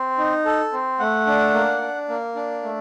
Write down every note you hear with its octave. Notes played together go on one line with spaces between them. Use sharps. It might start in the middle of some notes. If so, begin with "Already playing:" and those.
Already playing: C4
D#4
A4
C4
A3 F#5
D4
A#3
D4
A#3
D4
A3